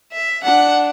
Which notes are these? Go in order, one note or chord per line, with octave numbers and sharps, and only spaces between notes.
E5
D4 F#5